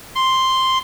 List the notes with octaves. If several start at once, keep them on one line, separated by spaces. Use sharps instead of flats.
C6